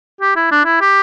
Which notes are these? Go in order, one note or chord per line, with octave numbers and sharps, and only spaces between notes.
G4
E4
D4
E4
G4